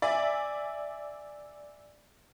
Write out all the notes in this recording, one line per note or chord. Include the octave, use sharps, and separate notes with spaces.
D5 E5 G#5